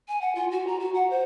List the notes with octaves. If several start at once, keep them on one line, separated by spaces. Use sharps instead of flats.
G#5
F#5
F4
F#4
A#5
F#4
F#5
C5